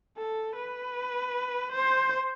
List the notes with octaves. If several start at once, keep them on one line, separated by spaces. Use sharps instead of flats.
A4
B4
C5